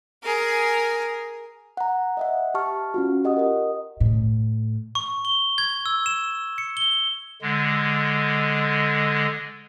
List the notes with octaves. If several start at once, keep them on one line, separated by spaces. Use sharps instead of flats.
G#4 A#4
F#5 A#5
D#5 E5 F#5
G4 A5 C#6 F6
C#4 F4 F#4
G4 D#5 F#5 D#6
A#4 D#5
A2
C#6
G7
G#6
E6
E7
C#7
G7
D3 G#3